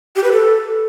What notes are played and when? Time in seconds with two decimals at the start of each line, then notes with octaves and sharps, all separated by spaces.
0.16 G4
0.24 B4
0.32 A4